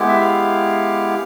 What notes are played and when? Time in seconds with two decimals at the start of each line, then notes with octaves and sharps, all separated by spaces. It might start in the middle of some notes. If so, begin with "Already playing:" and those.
Already playing: G#3 B3 E4 G4
0.08 E5
0.21 F5